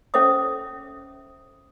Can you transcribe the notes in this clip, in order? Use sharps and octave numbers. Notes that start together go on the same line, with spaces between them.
C#4 A4 C5 E5 D6 D#6